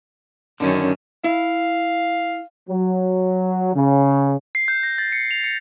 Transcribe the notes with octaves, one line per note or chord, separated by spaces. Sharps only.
F#2 D3 D#3 C#4
E4 F5
F#3
C#3
C7
G6
A#6
A6
C#7
F7
C#7